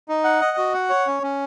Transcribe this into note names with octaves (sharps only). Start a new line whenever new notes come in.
D#4
F#5
D#5
F#4
F#5
C#5
C#4
C#4